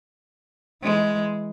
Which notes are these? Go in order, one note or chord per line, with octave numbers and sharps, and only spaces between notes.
E3 G#3